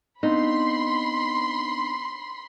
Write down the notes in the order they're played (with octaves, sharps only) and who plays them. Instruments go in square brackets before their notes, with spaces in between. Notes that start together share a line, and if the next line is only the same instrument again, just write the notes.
[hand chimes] B3 C4 D4 [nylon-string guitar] D#4 [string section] B5 C6